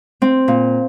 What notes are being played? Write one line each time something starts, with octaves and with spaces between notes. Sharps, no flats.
C4
A#2